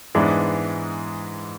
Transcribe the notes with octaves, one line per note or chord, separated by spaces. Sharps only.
G#2 E3 G#3 B3 D4